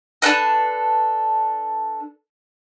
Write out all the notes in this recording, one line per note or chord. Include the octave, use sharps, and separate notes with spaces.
D4 A4 B4 D#5